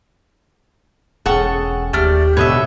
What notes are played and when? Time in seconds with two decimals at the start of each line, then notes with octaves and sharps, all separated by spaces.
1.26 E1 C#4 G#4 A4 F#5 C#6
1.93 D#2 A3 G4 D5 F6
2.37 B2 D3 B4 C#5 D#5 E5